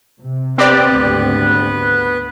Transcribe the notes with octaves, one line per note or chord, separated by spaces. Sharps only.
C3
B3 C4 G4 B4 D5
D2 G#2 C#3